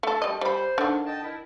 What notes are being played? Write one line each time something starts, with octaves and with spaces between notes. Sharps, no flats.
A3 A4
G3 D#5
G3 C5 B5
D3 D#3
D#5 G5 A5
E4 A#4